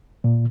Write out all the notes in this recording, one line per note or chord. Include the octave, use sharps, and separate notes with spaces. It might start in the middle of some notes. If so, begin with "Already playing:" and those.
A#2